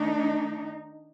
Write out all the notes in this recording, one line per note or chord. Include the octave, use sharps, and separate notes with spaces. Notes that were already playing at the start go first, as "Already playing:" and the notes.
Already playing: D#3 A3 D4 D#4